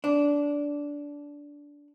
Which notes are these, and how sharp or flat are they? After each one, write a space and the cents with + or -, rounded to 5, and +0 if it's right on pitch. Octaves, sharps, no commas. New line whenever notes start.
D4 -15